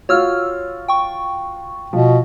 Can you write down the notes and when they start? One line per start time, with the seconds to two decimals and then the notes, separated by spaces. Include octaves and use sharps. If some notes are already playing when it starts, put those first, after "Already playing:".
0.09 F4 F#4 C#5 E6 F6
0.88 G5 C#6
1.93 B2 F3